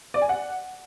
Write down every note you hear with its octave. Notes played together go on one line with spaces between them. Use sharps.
D5
G#5
F#5